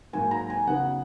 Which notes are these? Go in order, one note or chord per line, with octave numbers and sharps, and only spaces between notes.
G#2 F#3 A#3 G#5
A#5
G#5
C#3 F#3 B3 D#4 F#5